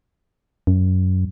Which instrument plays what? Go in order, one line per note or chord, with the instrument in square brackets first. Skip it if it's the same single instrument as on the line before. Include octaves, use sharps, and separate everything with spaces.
[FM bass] F#2